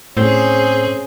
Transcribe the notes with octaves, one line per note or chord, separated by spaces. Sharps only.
A2 C4 C#4 G#4